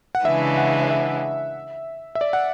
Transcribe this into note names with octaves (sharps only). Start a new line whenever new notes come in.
F#5
C#3 E3 G#3 D4 E5
F#5
E5
E5
D5
F#5